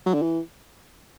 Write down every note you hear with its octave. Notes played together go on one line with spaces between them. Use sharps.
F#3
D3
E3